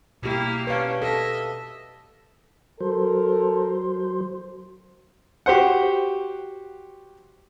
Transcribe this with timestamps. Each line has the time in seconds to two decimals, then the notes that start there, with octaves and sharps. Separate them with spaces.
0.23 B2 A#3 E4 G4
0.67 C#4 D4 B4 F5
1.02 A4 D#5 E5
2.81 F#3 A4 A#4 C5
5.46 F#4 G4 C5 F#5